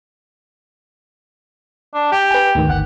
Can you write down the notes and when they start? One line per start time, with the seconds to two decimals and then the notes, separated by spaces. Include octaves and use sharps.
1.94 D4
2.12 G4
2.31 B4 G#5
2.55 D2 G#2 D#3
2.69 G1 F#5